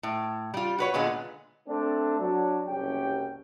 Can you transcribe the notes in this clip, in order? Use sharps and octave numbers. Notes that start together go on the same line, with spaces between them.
A2
G3 F4
F#4 B4 C#5
A#2 D3 G#3 B3 F4
A3 C4 D4
F#3 D4
F#1 C2 C#4 G4 G5